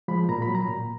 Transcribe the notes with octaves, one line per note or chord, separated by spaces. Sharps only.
F3 G#3 B5
A#2 A#5
B5
F#3
A#5
A#2